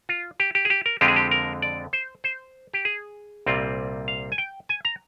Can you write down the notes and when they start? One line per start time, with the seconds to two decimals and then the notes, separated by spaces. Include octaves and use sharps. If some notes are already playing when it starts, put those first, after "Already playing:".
0.09 F4
0.40 G4
0.55 G4
0.65 G#4
0.70 G4
0.86 A#4
1.01 F2 D3 G#3 C4 F4 G4
1.08 G#4
1.16 G4
1.31 A#4
1.62 D5
1.93 C5
2.24 C5
2.73 G4
2.85 G#4
3.46 C2 A#2 G3 C4 F4
4.08 F5
4.32 G#5
4.38 G5
4.69 G#5
4.85 A#5